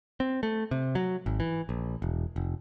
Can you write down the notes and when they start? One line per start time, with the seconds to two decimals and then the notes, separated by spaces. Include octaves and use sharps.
0.20 C4
0.43 A3
0.71 C3
0.95 F#3
1.26 G#1
1.40 E3
1.69 A#1
2.02 E1
2.36 F1